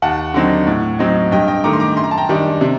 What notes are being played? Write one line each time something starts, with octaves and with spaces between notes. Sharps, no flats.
D#2 F#5 A5
D3 F#3 C4 D#4
A2
F#3 C4 D#4
G2 D#5 G5
D#5 G5
D#3 A3 A#5 D6
C6
A#5 D6
F#2 C6
A#5
A5
G5 A#5
D#3 G3 D4
C3